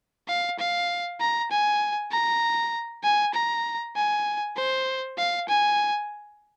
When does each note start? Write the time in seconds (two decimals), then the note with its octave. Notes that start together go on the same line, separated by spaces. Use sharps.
0.28 F5
0.59 F5
1.20 A#5
1.51 G#5
2.12 A#5
3.04 G#5
3.34 A#5
3.96 G#5
4.56 C5
5.18 F5
5.48 G#5